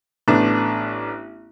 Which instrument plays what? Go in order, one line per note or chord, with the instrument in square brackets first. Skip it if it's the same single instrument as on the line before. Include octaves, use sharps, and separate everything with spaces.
[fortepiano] A1 A3 B3 D4 D6